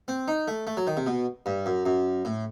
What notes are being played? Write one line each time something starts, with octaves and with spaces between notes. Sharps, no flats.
C4
D#4
A3
A3
F#3
D#3
C3
B2
G2
F#2
F#2
A2